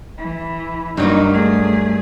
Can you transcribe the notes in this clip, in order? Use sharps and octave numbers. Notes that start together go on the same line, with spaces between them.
E3
G2 F#3 A#3 D#4
A3 G#4